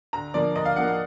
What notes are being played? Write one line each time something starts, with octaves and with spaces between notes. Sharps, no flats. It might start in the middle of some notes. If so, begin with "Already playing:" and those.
D2 A#5
D3 F3 A#3 D5
D2 D#5
F5
D3 F3 A#3 F#5
F#5